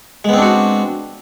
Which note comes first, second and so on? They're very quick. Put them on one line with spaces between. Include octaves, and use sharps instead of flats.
G#3 B3 C4 D4 F#4